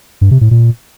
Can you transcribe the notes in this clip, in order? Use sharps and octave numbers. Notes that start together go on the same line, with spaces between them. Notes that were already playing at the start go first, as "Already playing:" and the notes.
G2
C3
A2
A#2